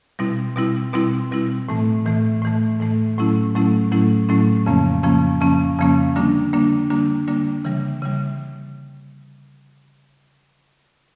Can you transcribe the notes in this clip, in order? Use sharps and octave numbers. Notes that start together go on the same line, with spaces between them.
B2 G3 C4 E4
B2 G3 C4 E4
B2 G3 C4 E4
B2 G3 C4 E4
A2 E3 A3
A2 E3 A3
A2 E3 A3
A2 E3 A3
A2 F#3 A3 C#4 E4
A2 F#3 A3 C#4 E4
A2 F#3 A3 C#4 E4
A2 F#3 A3 C#4 E4
F2 C#3 F3 A#3 C#4
F2 C#3 F3 A#3 C#4
F2 C#3 F3 A#3 C#4
F2 C#3 F3 A#3 C#4
D3 G3 A#3 D4
D3 G3 A#3 D4
D3 G3 A#3 D4
D3 G3 A#3 D4
C#3 E3 G3
C#3 E3 G3